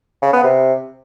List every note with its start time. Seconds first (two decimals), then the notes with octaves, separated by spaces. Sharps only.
0.22 C#3
0.33 B3
0.44 C3